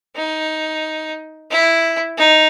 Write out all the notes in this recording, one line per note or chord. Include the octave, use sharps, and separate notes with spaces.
D#4
E4
D#4